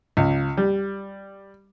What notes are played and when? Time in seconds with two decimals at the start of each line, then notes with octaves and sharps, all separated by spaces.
0.17 C#2
0.57 G3